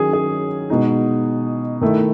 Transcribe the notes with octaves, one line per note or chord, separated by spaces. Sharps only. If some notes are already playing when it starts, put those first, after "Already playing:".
Already playing: D#3 F#3 C#4 G#4
G#4
B2 G#3 D#4
D#3 A3 E4